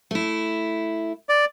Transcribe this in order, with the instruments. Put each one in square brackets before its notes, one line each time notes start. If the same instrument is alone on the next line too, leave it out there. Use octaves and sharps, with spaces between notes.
[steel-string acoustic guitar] A3 E4
[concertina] D5